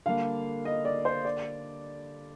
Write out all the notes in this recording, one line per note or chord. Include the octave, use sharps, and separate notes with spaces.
D3 G3 A#3 D4 F5
D#5
D5
C5
D5